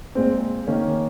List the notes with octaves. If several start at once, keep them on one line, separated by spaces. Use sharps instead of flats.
A#2 G#3 C4
D#3 A#3 C#4